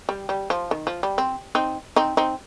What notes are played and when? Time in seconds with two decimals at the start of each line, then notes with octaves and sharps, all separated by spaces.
0.09 G3
0.29 G3
0.50 F3
0.71 D#3
0.87 F3
1.03 G3
1.18 C4
1.55 C4 D#4
1.96 C4 D#4
2.17 C4 D#4